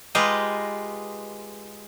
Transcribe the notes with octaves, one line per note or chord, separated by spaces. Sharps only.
G#3 F4 G4 B4 D#5 A#5